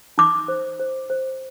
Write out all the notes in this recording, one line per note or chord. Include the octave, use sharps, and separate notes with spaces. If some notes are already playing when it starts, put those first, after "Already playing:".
D#4 D6
C5
C5
C5